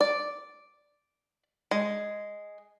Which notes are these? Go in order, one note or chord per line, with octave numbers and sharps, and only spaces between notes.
D5
G#3